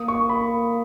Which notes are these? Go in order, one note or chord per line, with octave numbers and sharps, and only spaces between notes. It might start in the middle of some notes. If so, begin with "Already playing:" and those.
Already playing: A#3 D#6
C#6
B5